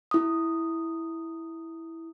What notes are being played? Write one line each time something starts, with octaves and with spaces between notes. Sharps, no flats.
E4 D#6